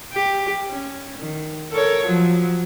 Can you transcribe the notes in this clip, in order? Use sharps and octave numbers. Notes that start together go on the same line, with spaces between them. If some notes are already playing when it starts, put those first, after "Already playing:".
G4
C#4
D#3
A4 A#4 C#5
F3 F#3